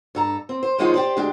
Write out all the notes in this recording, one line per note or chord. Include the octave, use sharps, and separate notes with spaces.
G2 A4 A#5
C4
C5
D#3 F3 G#3 C#4 D#4 F4
G4 C5 D5
D2 G#3 D4 G4